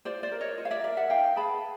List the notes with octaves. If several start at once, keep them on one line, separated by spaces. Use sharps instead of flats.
F4 C5 D5
C5 D5
A#4
C#5 D#5
F4
F5
D5 E5
A#4 D5 E5
E5 F#5
D#4 F5 G5
G#4 B4 A5 B5